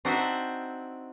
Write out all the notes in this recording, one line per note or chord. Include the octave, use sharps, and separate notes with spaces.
C4 D4 D#4 F#4 C5 E5